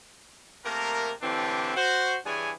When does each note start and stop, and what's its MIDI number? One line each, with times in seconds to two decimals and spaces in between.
0.65 1.11 48
0.65 1.11 57
0.65 1.11 58
0.65 1.11 70
1.22 1.72 45
1.22 1.72 50
1.22 1.72 52
1.22 1.72 60
1.22 1.72 62
1.22 1.72 67
1.75 2.17 66
1.75 2.17 72
2.25 2.51 43
2.25 2.51 52
2.25 2.51 62
2.25 2.51 68
2.25 2.51 73
2.25 2.51 80